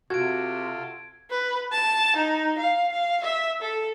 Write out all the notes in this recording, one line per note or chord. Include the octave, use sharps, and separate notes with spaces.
C3 F4 F#4 A4 G#6 D7
B4
A5
D#4
F5
F5
E5
A4